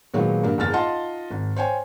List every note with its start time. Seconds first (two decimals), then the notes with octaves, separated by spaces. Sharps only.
0.14 A#2 D#3 F#3 G#3 B3 F#4
0.43 G2 A#3
0.58 F#1 E2 F6 A6
0.73 D#4 F4 D#5 F#5 A5 C6
1.31 G#1
1.56 C5 C#5 G5 G#5